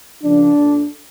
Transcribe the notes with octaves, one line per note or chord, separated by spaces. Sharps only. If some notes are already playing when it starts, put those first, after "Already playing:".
C#3 F3 A#3 D4
A#2 A3